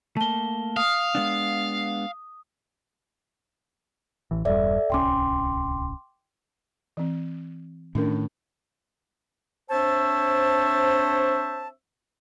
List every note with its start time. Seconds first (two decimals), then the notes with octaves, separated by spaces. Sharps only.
0.17 A3 A#3 A5 G7
0.77 F5 D#6
1.15 G#3 B3 D4
4.31 A1 E3
4.45 E1 G2 G3 A4 D5 E5
4.90 D1 C2 C#4 G5 C6 D6
6.97 E3 C4
7.95 A2 D#3 C#4 D4 A#4
9.70 C4 D4 C5 C#5 E5 A5